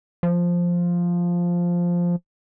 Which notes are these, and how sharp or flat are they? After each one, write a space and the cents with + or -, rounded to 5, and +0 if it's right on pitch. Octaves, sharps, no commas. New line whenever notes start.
F3 +0